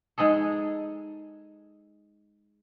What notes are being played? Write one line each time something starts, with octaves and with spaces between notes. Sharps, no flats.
G#3 D#4 G#4 A4